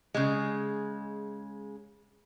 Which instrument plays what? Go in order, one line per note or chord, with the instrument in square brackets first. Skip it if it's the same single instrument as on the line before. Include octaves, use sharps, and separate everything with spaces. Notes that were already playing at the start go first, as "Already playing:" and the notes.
[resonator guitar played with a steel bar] C#3 G#3